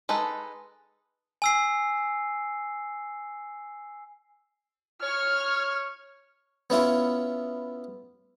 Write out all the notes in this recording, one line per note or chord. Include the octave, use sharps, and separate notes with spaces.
G#3 D#4 A4 B4
G#5 E6 C7
C#5 F6
B3 C#4 E4 F4